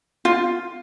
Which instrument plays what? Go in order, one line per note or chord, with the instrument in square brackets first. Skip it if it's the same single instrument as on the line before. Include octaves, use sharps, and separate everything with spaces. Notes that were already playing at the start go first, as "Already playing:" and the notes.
[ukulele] F4